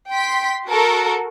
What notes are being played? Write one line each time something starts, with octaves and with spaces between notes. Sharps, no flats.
G5 C6 B6
F#4 A4 A#4